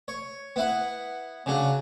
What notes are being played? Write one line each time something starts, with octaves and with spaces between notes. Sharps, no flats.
C#5
B3 E4 F#5
C#3 F#3 D4